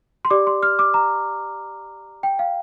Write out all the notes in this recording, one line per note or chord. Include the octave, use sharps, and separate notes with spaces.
C6
G4 D5 D6
C6
F6
D6
A#5
G5
F5